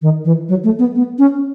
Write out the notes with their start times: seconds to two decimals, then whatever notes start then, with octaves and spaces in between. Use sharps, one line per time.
0.02 D#3
0.25 E3
0.49 F#3
0.64 A3
0.79 B3
0.95 B3
1.19 C#4